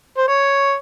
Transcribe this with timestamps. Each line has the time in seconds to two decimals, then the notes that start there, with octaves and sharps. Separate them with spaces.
0.17 C5
0.28 C#5